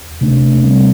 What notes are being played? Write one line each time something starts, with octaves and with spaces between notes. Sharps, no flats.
C3 A3 D4
C3 G3 C4